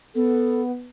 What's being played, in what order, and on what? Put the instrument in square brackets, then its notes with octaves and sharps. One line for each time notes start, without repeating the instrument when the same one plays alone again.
[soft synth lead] B3 [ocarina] A4